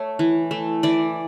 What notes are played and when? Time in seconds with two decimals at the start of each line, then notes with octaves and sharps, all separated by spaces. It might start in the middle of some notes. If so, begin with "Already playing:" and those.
Already playing: A3 C#5
0.19 E3
0.51 A3
0.83 E3 D5